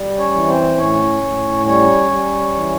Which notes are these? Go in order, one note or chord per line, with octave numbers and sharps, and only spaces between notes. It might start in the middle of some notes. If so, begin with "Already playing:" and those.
Already playing: G3
C#4 C#5
E3
C4 C5
A2 C#4 C#5
A2
G3 C#4 C#5
G3
E3